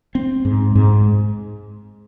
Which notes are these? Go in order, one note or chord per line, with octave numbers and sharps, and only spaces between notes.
C4
G#2
G#2